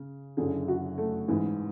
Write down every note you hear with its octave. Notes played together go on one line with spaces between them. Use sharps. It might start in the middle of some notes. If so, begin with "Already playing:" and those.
Already playing: C#3
F#1 F#2 D3 G#4
F#4
A3
A1 G#2 E3